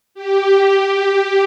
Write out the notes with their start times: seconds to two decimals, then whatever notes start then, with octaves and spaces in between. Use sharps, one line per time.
0.14 G4